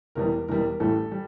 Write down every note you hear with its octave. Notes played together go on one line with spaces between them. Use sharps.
E1 E2 E3 G3 A#4
E1 E2 E3 G3 A#4
A1 A2 E3 G3 A4
G3